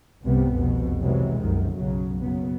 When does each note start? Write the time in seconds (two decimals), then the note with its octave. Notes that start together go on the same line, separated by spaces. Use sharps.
0.22 C2 G2 C3 G3 B3
0.53 F1 C2 F2 B2
1.02 C3 E3 F#3 G#3
1.40 G1 C2 F#2 D#3
1.73 B1 C#3 F#3
2.23 F#1 C#3 F#3 B3